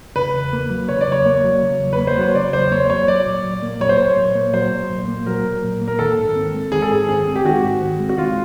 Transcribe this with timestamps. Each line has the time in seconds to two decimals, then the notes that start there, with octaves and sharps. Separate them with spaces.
0.16 C#3 B4
0.34 E2
0.53 A#3
0.70 F#3
0.88 C#3 C#5
1.01 D5
1.07 E2 C#5
1.26 A#3
1.44 F#3
1.61 C#3
1.80 E2
1.93 B4
1.98 A#3
2.07 C5
2.17 F#3 C#5
2.34 C#3 D5
2.53 E2 C5
2.72 A#3 C#5
2.90 F#3 C#5
3.08 F#3 D5
3.26 A#2
3.45 A#2
3.63 A#3
3.80 F#3 C#5
3.89 C5
3.97 A#2 C#5
4.17 A#2
4.35 A#3
4.54 F#3 C5
4.71 A#2
4.90 A#2
5.08 A#3
5.26 F#3 A#4
5.45 A#2
5.63 A#2
5.81 A#3
5.88 A#4
5.99 D#3 A4
6.17 G#2
6.36 C4
6.54 G#3
6.72 D#3 G#4
6.82 A4
6.91 G#2 G#4
7.09 C4 G#4
7.27 G#3
7.36 G4
7.45 D#3 F#4
7.64 G#2
7.81 C4
8.00 G#3
8.09 F#4
8.18 D#3 F4